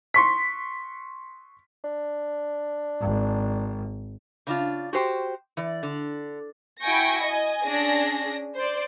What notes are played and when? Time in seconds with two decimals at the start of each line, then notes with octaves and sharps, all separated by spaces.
0.14 C6 C#6 B6
1.84 D4
3.01 G#1
4.47 C#3 D4 F4
4.93 F#4 G4 C5 G5
5.57 E3 D5
5.83 D3
6.81 E4 F#4 G5 G#5 C#6 A#6
7.24 D#5 G#5
7.66 C#4 D4 G#4 A#6
8.56 C5 D5